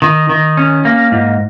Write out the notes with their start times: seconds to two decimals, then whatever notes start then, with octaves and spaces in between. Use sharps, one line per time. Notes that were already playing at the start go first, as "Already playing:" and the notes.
0.02 D#3
0.29 D#3
0.57 C#4
0.85 A#3
1.12 G#2